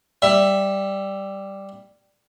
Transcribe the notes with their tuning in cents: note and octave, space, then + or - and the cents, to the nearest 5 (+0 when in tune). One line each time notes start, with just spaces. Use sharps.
G3 +0 E5 +10